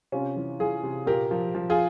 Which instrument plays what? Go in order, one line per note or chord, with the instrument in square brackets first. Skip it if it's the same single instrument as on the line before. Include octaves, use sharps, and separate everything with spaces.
[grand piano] C3 C#4 F4
E3
E3 F4 G#4
C3
A#2 G4 A#4
F3
F3
F4 G#4